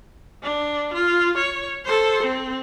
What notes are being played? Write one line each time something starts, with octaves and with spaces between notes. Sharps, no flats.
D4
F4
C#5
A4 C5
C4